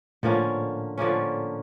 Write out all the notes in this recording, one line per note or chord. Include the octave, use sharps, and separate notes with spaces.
A2 D3 F3 A#3 C#4
D3 F3 A#3 C#4